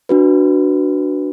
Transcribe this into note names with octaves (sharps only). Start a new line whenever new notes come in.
D4 F#4 B4